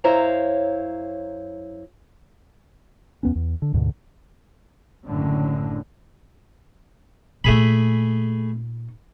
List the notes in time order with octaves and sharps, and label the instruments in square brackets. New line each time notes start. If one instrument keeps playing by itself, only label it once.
[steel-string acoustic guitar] F#2 E4 C5 C#5 F5 A#5
[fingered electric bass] E2 B3 C#4
E2
D3
D2 G#2 B2 D3
[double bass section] F#1 F#2 A2 D3
[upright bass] A#2 D#4 [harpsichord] A3 G#4 B5